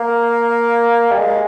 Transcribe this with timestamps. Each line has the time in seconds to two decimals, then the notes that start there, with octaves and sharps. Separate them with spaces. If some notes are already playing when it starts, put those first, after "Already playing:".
Already playing: A#3
1.12 G3
1.18 G#3